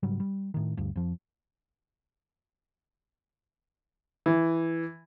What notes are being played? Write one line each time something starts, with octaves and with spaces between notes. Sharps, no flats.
G#2 C#3 F#3 G3
G3
A2 D#3
G1 D2 G2
F2 F3
E3